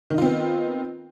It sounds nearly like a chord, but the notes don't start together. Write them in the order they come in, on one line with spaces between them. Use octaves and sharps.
D#3 D#4 F4 C4 B3